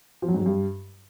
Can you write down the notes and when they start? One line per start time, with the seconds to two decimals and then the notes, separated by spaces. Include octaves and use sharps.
0.22 F3
0.28 F#3
0.34 G#2
0.40 F#3
0.46 G2